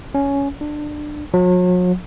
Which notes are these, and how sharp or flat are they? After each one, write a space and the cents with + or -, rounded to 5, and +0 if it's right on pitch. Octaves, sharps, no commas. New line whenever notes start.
C#4 +10
D4 +20
F#3 -40